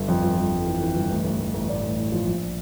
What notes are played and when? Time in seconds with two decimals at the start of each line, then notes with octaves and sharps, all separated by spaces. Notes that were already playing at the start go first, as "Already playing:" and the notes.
Already playing: G1
0.08 F2
0.23 G1
0.37 G1
0.51 G1
0.66 E3
0.81 E3
0.95 G1
1.10 A1
1.24 A1
1.40 A1
1.54 A1
1.68 A2 D5
1.83 A1
1.98 A2
2.12 F3
2.27 A#1